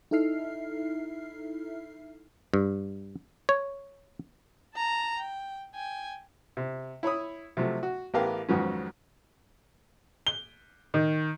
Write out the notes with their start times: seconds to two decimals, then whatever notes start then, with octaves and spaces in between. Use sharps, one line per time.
0.11 D#4 E4 A4 E5 F6 C7
2.54 G2
3.49 C#5
4.74 A5 A#5
5.19 G5
5.75 G5 G#5
6.57 C3
7.03 E4 C#5 B5 D#6
7.57 C3 F3 F#3 A3
7.83 F#4
8.14 A1 B3 G4 A#4 F5
8.49 F2 G#2 D#3 F#3 B3 C#4
10.27 G7
10.94 D#3